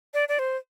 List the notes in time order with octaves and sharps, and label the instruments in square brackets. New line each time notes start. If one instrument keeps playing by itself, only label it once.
[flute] D5
D5
C5